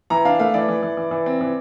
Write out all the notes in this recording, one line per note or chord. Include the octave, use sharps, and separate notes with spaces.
E3 A#5
D4 F5
A3 F5
E3 D5
E3
E3
E3
E3
C4
E3